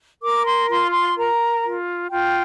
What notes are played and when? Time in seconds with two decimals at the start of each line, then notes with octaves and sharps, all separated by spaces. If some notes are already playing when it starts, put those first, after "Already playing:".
0.22 A#4 D6
0.45 C6
0.68 F4 C6
0.92 C6
1.16 A#4 A#5
1.63 F4
2.10 F4 G5